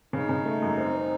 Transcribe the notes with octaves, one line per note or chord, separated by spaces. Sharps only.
C#3 D#4
C#3
A3
F#2
C4
C4